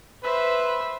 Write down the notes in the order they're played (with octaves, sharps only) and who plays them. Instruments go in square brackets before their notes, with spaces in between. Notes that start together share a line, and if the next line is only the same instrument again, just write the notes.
[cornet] B4 [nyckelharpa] C5 E5